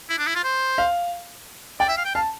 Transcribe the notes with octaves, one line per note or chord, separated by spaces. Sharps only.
E4
D4
E4
F4
C5
F5
D5 G5
E5
F5
G5
F5 A5